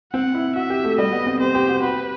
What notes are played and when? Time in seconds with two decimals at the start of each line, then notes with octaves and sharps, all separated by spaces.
0.14 C4 F#5
0.35 E4
0.56 F#4 E5
0.70 G4
0.84 A3
0.98 G3 D#5
1.12 B3
1.26 C4
1.40 G4 C5
1.55 G4
1.69 F#4
1.82 F#4 B4